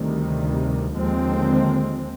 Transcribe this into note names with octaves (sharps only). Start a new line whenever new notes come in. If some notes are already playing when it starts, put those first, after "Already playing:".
Already playing: D2 C3 D#3 G3
D#2 D3 F3 G#3 C4